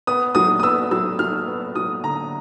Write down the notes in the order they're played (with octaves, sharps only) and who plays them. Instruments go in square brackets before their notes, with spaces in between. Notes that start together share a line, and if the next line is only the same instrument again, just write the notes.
[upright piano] B3 D#6
F#3 D#6
D#6
B3 E6
F#3 E6
F#3 F6
B3
F#3 D#6
D3 A#5